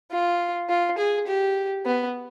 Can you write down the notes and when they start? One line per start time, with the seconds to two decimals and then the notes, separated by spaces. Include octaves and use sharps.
0.11 F4
0.69 F4
0.98 G#4
1.27 G4
1.85 B3